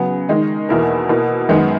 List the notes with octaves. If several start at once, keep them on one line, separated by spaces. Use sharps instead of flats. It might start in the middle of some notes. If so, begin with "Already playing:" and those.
Already playing: C#3 F#3 B3
D#3 G#3 D#4
E2 B2 A#3 E4 A#4
B2 A#3 E4
F#2 D#3 G#3 B3